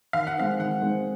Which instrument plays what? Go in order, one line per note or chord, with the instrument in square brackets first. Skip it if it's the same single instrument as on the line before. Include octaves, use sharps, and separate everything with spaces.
[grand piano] D#3 [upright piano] F5
[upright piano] F#5
[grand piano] G#3 C4 D#4 [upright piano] F5
[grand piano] D#3 [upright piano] F#5
[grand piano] G#3 C4 D#4